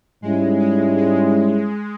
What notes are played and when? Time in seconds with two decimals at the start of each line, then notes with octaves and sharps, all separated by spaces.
0.22 G#2 G3 G#3 C#4 E4
0.60 G#3
0.97 G#3